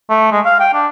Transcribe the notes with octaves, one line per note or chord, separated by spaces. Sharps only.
A3
G#3
F5
G5
D4